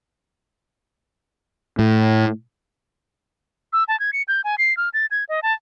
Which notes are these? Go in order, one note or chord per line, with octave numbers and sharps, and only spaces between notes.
A2
E6
A5
G#6
C#7
G6
G#5
C7
F6
A6
G#6
D#5
A5